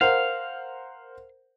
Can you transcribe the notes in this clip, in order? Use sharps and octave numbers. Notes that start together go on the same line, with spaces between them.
A#4 C5 F5 F#5